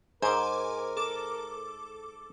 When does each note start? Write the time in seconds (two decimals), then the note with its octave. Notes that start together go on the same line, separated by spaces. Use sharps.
0.22 G#2 A#4 C5 G#5 D6
0.97 A4 D6